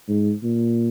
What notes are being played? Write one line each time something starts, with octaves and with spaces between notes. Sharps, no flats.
G#2
A#2